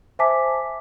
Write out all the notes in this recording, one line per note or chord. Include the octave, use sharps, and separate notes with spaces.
C5 E5 G#5 A5 D6 B6